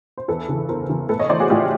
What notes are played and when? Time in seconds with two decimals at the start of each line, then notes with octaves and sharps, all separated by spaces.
0.18 C5
0.28 E2 A4 B4
0.48 C#3 E3
0.69 E2 A#4 C5
0.89 C#3 E3
1.09 A2 A4 B4
1.19 C#5 D#5
1.29 E3 C5 D5
1.40 F#4 G#4
1.50 A2 F4 G4